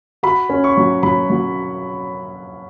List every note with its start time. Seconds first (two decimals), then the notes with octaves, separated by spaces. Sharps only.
0.23 F#4 B5
0.49 C#4
0.64 C#6
0.77 F#3
1.03 F#3 B5
1.30 F#3